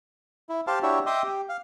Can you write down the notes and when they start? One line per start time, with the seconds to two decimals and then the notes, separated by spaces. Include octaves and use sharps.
0.49 E4
0.67 G4 C5 F5 A5
0.83 D4 E4 F#4 G4 C#5 E5
1.06 D#5 E5 G5 C6 D6 D#6
1.24 G4
1.49 F5